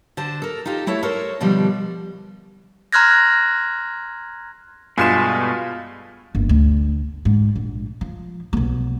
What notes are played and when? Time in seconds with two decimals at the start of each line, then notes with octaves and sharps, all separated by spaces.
0.17 D3 C5 A5
0.42 A4 A#4
0.66 D#4 F4 G4 A4
0.87 A3 E4 A4 C#5
1.03 A4 A#4 C5 C#5
1.41 B2 D3 F3 G3
2.93 A#5 C6 F6 F#6 G#6 A#6
4.98 G2 B2 G#3 A3 F4 G#5 C6 E7
6.35 G1 D#2
6.49 D2
7.25 G#2
7.56 A#1
8.01 F3
8.53 B1 B3